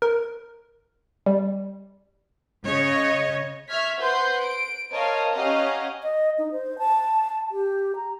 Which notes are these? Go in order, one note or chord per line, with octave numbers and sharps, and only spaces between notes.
A#4
G3
C#3 C#5 D#5
E5 C#6 F6 G#6 B6
B4 C5 F#5 C6 G6
D7
A#4 C5 C#5 D#5 F5 A5
C#4 G4 D#5 F5 F#5 A#5
D#5
D#4
C5
A5
G4
A#5